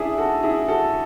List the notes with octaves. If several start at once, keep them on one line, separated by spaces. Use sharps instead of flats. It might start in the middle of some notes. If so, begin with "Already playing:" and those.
Already playing: D4 E4 G#4
F#4 A4
E4 G#4
F#4 A4